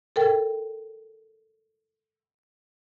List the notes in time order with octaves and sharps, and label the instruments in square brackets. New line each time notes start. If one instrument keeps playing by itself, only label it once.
[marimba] A4 A#4 G5